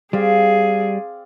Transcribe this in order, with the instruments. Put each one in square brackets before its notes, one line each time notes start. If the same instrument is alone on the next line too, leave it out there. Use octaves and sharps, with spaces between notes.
[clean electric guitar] G3 [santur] C4 D5 F5 [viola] G#4